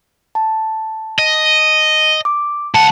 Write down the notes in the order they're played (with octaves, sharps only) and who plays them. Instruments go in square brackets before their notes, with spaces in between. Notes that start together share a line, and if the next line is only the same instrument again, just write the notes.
[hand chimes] A5
[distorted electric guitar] D#5
[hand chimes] D6
[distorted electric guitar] C#2 F#5 [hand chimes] A5